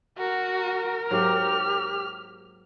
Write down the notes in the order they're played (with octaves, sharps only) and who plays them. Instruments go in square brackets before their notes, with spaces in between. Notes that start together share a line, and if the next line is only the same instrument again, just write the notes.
[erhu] F#4 [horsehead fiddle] A#4
[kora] G#2 F#3 A#3 [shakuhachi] G4 [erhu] F6